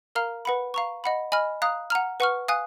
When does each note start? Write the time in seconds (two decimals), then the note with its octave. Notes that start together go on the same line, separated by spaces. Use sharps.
0.15 A#4 F5 A#5 F6
0.45 B4 F#5 B5
0.74 F5 A#5 C#6
1.04 D#5 F#5 B5
1.32 D#5 G#5 B5 F6
1.62 F5 A#5 D#6 F#6
1.90 F#5 A#5 F6
2.20 B4 F#5 C#6 F6
2.48 F5 G#5 D#6 F#6